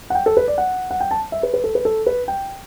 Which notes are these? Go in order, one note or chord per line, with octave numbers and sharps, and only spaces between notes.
F#5
G5
A4
B4
D5
F#5
F#5
G5
A5
E5
B4
B4
A4
B4
A4
B4
G5